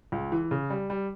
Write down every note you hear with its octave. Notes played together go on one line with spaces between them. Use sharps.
C#2
E3
C#3
G3
G3